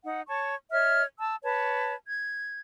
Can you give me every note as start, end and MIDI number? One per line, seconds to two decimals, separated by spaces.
0.04 0.22 63
0.04 0.22 78
0.28 0.55 73
0.28 0.55 81
0.28 0.55 85
0.72 1.04 73
0.72 1.04 75
0.72 1.04 76
0.72 1.04 89
1.20 1.35 81
1.20 1.35 88
1.43 1.94 71
1.43 1.94 73
1.43 1.94 81
2.07 2.61 92